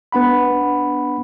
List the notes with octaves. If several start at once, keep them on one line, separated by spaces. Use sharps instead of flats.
B3 D4 F#5 B5